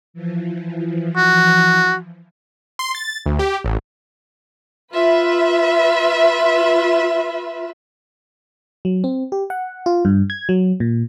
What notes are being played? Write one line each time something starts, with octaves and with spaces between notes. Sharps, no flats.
E3 F3
F#4
C6
A6
D2
G4
A1
F4 B4 E5
F#3
C4
G4
F#5
F4
G2
G#6
F#3
A#2